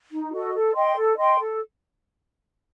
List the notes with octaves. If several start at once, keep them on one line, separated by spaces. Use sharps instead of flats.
D#4
F#4 A4 D#5
A4
D#5 G5 C6
A4
D#5 G5 C6
A4